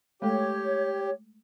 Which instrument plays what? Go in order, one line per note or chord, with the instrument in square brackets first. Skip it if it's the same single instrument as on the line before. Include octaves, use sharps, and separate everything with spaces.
[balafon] G#3 A3 A4 [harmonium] G4 [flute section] C#5